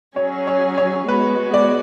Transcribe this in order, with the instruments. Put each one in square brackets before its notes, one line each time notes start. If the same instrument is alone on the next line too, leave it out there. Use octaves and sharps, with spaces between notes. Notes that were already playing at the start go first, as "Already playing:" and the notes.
[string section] F#3 C#4 G#4 [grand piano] C#5
[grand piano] C#5
C#5
[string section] G#3 B3 F#4 [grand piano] B4
[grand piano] D5